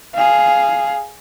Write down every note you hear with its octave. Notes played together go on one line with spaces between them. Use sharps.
G#4 F5